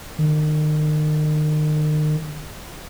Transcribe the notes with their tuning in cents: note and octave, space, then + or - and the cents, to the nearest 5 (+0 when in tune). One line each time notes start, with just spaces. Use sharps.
D#3 -35